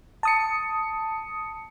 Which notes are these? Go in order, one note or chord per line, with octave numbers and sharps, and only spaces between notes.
A5 D#6 C#7